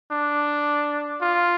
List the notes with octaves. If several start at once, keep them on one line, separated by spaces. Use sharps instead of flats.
D4
F4